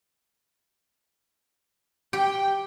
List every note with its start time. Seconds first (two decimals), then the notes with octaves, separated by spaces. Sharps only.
2.13 G4 G5